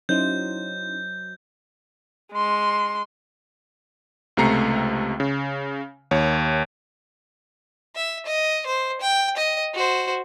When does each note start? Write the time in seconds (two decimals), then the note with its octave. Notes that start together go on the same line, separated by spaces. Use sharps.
0.09 F#3 C#4 D#4 E4 C5 D#5 G6
2.34 G#3 C6
4.37 C#2 C3 A3 A#5 C7 C#7
5.20 C#3
6.11 D#2 C#5
7.95 E5
8.26 D#5
8.66 C5
9.01 G5
9.37 D#5
9.74 F#4 C5